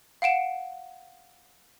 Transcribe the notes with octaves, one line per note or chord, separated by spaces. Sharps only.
F5 F#5 D7 E7